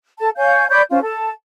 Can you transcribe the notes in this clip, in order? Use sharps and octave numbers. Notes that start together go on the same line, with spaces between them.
A4 A5
C#5 F5 G#5 G6
C#5 D5 B5 G6
C#4 F4 C5
A4 A5